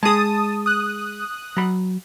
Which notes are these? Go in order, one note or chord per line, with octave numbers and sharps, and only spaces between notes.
G#3 G#4 A5 D#6
D#6 F#6
F#3 B5